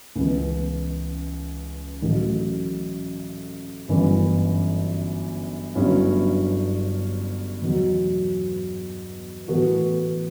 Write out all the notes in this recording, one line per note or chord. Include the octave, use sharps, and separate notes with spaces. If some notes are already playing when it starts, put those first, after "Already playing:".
C#2 C#3 E3 B3
A1 A2 F#3
G1 F#2 E3
G1 G2 F#3 C#4 E4
E2 B2 F#3
A2 E3 B3 F#4 A4